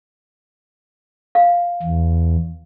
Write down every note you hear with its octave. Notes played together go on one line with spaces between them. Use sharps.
F5
E2